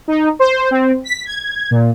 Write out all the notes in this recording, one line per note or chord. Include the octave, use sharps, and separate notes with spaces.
D#4
C5
C4
B6
G#6
A#2